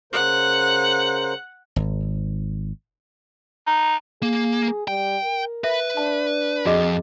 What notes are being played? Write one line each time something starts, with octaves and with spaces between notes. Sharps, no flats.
C#3 A#4 C5 F#5
G#1
D#4
A#3 G#4
G3 G5
A#4
B4 E5
D4 A5
F2 F#4 G#4 D#5